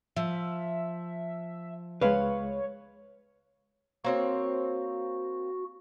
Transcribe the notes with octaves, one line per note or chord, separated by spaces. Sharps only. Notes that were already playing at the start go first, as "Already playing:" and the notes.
F3 E5
C#2 G#3 B4 C#5 F5
A#3 C4 F#4 C#5